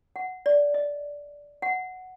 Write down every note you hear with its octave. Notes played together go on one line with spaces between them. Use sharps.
F#5
D5
D#5
F#5